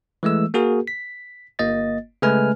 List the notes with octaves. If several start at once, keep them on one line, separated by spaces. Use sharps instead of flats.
E3 G#3 A3 E6
A#3 F#4 G#4 A#4
B6
G1 A#3 D#5 A6
C#3 G#3 A3 B4 G#5 F6